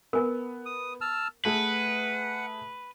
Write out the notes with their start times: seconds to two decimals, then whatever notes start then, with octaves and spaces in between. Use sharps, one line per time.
0.13 B3 A#4 G#5
0.66 D#6
1.01 A5 E6 F6
1.45 A3 G#4 B4 F#5